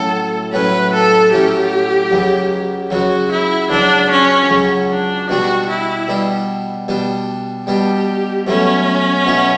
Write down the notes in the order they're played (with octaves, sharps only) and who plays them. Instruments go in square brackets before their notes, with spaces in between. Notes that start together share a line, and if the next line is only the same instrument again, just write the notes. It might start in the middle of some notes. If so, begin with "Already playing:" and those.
Already playing: [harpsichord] A2 F#3 C#4 [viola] A4
[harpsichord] A2 F#3 C#4 [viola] B4
[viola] A4
[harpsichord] A2 F#3 C#4 [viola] G4
[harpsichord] C#2 C#3 F#3
[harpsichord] C#2 C#3 F#3 [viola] F#4
[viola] E4
[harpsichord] C#2 C#3 F#3 [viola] D4
[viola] C#4
[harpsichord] C#2 C#3 F#3
[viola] D4
[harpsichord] B2 G3 D4 [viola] F#4
[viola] E4
[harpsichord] B2 G3 D4
B2 G3 D4
[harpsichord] B2 G3 D4 [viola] G4
[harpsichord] B2 F#3 A3 E4 [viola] C#4
[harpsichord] B2 F#3 A3 E4